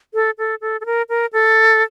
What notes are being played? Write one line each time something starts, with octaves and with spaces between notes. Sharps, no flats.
A4
A4
A4
A4
A#4
A#4
A4